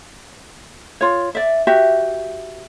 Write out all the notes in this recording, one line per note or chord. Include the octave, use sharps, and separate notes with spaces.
F4 C#5
D5 E5
F#4 G4 E5